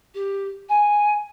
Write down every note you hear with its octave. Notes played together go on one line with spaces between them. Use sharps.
G4
G#5